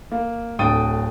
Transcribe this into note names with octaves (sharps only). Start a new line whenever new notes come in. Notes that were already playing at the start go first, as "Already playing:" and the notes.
A#3
D1 D3 G5 D#6 A6 D#7